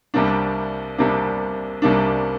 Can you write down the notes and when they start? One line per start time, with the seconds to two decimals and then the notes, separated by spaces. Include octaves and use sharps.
0.14 C2 C3 G3 A#3 D4
0.98 C2 C3 G3 A#3 D4
1.82 C2 C3 G3 A#3 D4